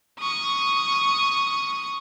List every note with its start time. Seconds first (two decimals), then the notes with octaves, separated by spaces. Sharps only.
0.20 C#6 D#6